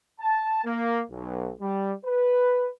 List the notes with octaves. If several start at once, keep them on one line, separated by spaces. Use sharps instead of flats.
A5
A#3
B1
G3
B4